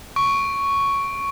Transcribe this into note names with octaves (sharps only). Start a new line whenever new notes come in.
C#6 D7